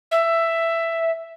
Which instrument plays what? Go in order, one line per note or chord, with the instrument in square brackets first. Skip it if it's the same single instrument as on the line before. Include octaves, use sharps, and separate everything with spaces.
[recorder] E5